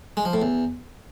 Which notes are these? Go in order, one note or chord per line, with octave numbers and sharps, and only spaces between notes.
G#3
F3
A2
E2